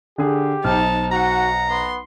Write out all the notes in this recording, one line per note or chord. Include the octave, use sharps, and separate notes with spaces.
D3 G4 G#4
B1 D#4 C5 A5 F6
F#4 F#5 A#5
B3 C6